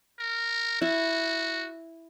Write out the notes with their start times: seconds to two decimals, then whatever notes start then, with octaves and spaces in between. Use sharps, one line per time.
0.20 A#4
0.81 E4 F#4